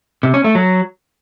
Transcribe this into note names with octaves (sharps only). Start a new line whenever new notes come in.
C3
C#4
A3
F#3